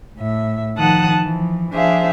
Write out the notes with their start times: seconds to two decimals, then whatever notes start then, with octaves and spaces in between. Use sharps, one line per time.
0.18 A2 E5
0.77 D#3 F3 F#5 A5 D#6 F#6
1.22 E3 F3
1.73 F3 D4 G#4 C5 E5 F5